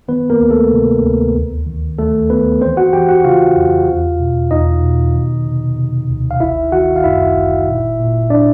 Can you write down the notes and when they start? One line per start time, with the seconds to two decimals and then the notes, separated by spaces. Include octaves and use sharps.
0.08 D#3 B3 B4
0.30 A#3 A#4
0.41 D2
0.51 A3 A4
0.72 C3
1.04 D2
1.35 D#2
1.67 D#3
1.99 D#3 A3 A4
2.30 D#3 B3 B4
2.61 E3 C4 C5
2.77 F#4 F#5
2.93 E3 G4 G5
3.09 F#4 F#5
3.24 C#3 F4 F5
3.56 F2
3.88 E2
4.20 B2
4.51 E2 D#4 D#5
4.83 B2
5.15 D#3
5.46 C3
5.77 C3
6.09 D2
6.31 F5
6.40 G1 E4 E5
6.72 D#3 F#4 F#5
6.96 F5
7.04 F#2 E4 E5
7.36 G1
7.67 A#2
7.99 A#2
8.30 D4 D5